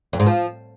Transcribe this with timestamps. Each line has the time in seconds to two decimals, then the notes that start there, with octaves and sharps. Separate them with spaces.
0.13 F2
0.20 G#2
0.26 F3